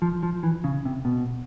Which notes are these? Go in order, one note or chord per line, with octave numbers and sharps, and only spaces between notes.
F3
F3
E3
C#3
C3
B2